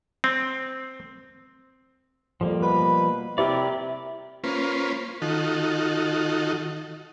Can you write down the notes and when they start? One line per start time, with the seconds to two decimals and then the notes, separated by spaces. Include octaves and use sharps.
0.24 C4
2.41 F2 F3 G3 A#3
2.63 B2 B4
3.38 C3 E4 G4 A#4 D5
4.44 A#3 C#4 F4 B4 C5
5.22 D#3 D#4 F4 F#4 A4